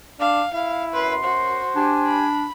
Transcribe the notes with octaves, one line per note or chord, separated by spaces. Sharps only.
D4 F5
E4 F5
F#2 B4 C6
F#4 C5
D4 G4 G#5
B5